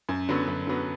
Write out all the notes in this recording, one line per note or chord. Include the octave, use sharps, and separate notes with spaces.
F#2
D3 F#3 B3
F#2
D3 F#3 B3